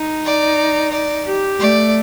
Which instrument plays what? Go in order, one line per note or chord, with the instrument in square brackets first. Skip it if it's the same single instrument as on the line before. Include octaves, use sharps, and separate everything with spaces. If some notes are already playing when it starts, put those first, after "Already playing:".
Already playing: [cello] D#4
[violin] D5
D5
[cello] G4
[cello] A3 [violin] D5